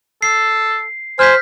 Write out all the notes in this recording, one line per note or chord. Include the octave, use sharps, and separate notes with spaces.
A4 C7
C5 G#5 F6 G6 B6